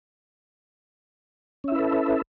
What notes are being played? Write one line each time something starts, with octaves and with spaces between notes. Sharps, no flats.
C#4 E4 A4 B4 E5